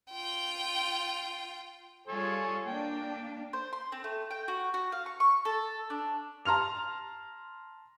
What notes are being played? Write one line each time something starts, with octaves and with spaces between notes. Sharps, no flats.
F4 G5
G3 F4 G#4 A4 C#5 G#5
A#3 D4 G5
C5
C6
C4
A3
G5
F#4
F#4
F5
C#6
C#6
A4
D4
A5 A#5 C6 F6 F7